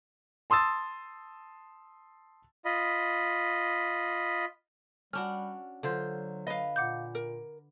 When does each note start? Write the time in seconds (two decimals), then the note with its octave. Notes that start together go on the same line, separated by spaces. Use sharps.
0.50 A5 C6 D#6 E6 A6
2.65 F4 D#5 B5
5.13 G3 C#4 D4 F#4 F6
5.83 D3 F#3 F4 C5
6.47 B4 D#5 F5
6.76 A#2 F#5 D6 G6
7.15 A#4